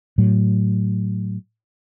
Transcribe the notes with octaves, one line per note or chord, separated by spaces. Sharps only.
A2 F#3